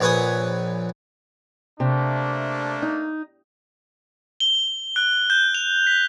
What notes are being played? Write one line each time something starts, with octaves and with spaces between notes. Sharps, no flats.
A#1 C#4 B4 C#5 G#5 D#6
C3 A3 A#3 D4
D#4
G7
F#6
G6
F7
B6